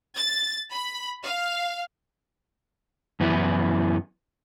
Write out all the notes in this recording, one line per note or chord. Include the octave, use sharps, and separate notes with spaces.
A6
B5
F5
F#2 E3 B3 E4